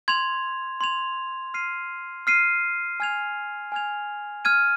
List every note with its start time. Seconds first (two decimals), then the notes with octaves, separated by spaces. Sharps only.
0.08 C6 G#6 F7
0.81 C6 G#6 F7
1.54 F6 C7 D#7
2.27 F6 C7 D#7
3.00 G#5 F6 G#6 F7
3.72 G#5 F6 G#6 F7
4.45 F6 G#6 D#7